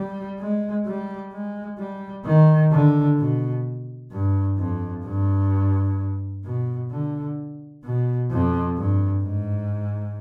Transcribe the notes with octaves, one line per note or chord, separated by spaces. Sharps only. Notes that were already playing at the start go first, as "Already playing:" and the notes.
Already playing: G3
G#3
G3
G#3
G3
D#3
D3
B2
G2
F2
G2
B2
D3
B2
F2
G2
G#2